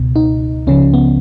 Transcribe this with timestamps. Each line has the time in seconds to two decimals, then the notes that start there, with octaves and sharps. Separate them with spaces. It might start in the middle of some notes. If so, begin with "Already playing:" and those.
Already playing: C#2 B2
0.16 D#4
0.67 C#2 C#3 F3 C#4
0.94 B3